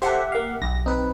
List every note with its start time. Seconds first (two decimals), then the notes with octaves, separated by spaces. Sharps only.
0.02 G4 A4 C5 E5 F#5
0.32 A#3 F5
0.62 B1 A#6
0.86 C4 D#4 B4